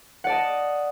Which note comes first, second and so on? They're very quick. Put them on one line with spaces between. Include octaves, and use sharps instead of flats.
F#5 D5 A5 D#5